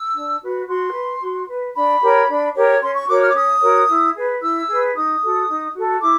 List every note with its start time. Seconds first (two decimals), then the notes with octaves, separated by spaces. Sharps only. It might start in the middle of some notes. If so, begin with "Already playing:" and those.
Already playing: E6
0.14 D4
0.41 F#4 B4
0.68 F#4 C6
0.94 B4
1.21 F#4
1.48 B4
1.74 D4 B5
2.01 G4 A#4 C#5
2.28 D4
2.55 G4 A#4 C#5
2.81 C#4 C6
2.95 C#6
3.07 F#4 A#4 C#5 D6
3.21 F6
3.29 D6
3.34 C#4 D#6
3.61 F#4 A#4 C#5
3.88 E4
4.14 G#4 B4
4.41 E4 E6
4.68 G#4 B4
4.94 D#4 D#6
5.21 F#4 A4
5.48 D#4
5.74 F#4 A4
6.01 E4 D6